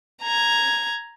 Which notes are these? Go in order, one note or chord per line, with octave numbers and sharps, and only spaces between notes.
A#5 G#6